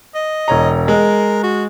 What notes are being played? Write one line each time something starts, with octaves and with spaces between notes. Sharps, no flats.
D#5
E1 C#5 A#5
G#3 A#4
F#4